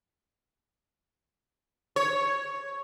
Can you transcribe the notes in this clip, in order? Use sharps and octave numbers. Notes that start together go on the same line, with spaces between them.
C#5